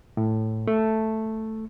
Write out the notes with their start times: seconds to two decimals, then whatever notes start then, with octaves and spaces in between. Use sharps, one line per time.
0.17 A2
0.68 A3